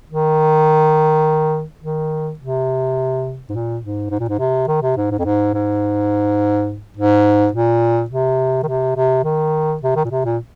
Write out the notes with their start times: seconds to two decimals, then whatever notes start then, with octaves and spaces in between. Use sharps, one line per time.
0.10 D#3
1.81 D#3
2.39 C3
3.49 G#2
3.53 A#2
3.81 G#2
4.10 G#2
4.20 A#2
4.29 G#2
4.39 C3
4.67 D#3
4.82 C3
4.97 G#2
5.11 G#2
5.19 F2
5.25 G#2
5.54 G#2
6.97 G#2
7.53 A#2
8.10 C3
8.63 D#3
8.68 C3
8.96 C3
9.24 D#3
9.83 C3
9.96 D#3
10.05 A#2
10.11 C3
10.25 A#2